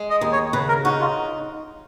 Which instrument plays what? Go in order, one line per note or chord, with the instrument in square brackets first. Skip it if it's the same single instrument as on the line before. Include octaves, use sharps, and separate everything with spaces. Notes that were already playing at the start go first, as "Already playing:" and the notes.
Already playing: [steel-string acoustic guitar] G#3
[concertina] D#5
[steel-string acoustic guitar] D#2
[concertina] C#5
[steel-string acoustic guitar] C#3 [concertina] B4
[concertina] A#4
[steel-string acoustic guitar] D#4 [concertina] F#4
[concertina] F4